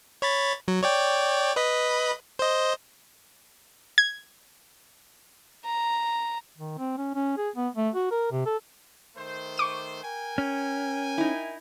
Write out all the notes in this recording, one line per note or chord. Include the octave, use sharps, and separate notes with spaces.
C#5 B5 A6
F#3
C#5 D5 G5
B4 D#5 B5
C5 D#5
G#6
A#5
D#3
C4
C#4
C#4
G#4
B3
A3
F#4
A#4
C3
A4
D#3 A3 C5
C#6 D6 D#7
A#4 G5 G#5
C#4
D#4 E4